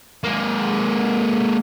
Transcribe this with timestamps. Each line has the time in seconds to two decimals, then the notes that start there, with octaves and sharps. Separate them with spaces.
0.24 G#3 A#3